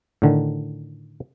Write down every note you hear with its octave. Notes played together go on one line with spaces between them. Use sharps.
A2 D3 D#3